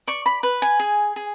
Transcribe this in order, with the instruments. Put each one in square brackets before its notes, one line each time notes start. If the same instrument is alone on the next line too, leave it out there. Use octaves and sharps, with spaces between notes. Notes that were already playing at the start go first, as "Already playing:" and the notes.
[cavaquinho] D5 C#6
B5
B4
G#5
G#4
G#4